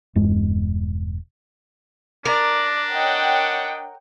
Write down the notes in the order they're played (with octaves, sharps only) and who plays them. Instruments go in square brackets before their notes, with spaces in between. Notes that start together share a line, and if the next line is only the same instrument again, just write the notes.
[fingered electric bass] E1 G2 G#3
[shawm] D4 [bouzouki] A#4 [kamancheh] D5
[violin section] C#5 F#5 G5 [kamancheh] D#5